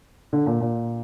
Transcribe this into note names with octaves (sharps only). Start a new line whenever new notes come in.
D3
A#2
A#2